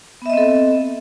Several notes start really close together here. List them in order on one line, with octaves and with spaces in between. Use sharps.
B3 E5 D#5 C4 A4